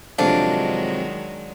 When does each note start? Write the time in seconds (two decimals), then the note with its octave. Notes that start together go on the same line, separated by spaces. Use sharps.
0.18 F2 C3 D#3 F#3 G#3 D4 F5